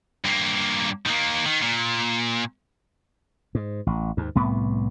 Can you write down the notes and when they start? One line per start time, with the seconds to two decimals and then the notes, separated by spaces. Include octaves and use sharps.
0.25 G2 A#3
1.06 D#3 A#3
1.46 D#3
1.62 A#2
3.55 G#2
3.87 A1
4.17 D#2 G#2
4.35 C2 A2 B3